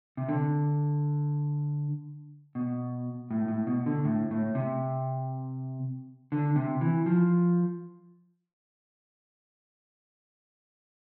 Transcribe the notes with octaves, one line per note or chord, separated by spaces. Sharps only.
C3
D3
B2
A2
A2
B2
D3
A2
A2
C3
D3
C3
E3
F3